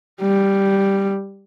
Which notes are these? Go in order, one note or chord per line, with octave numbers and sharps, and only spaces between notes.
G3